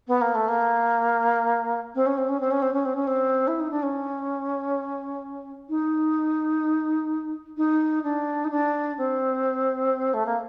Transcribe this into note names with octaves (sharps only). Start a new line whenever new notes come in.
B3
A#3
A3
A#3
C4
C#4
C4
C#4
C4
C#4
C4
C#4
C4
C#4
C4
E4
D#4
D4
C#4
D#4
D#4
D4
D#4
D4
C4
A3
A#3